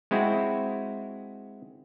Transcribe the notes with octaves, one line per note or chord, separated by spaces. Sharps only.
G#3 C4 E4 F#4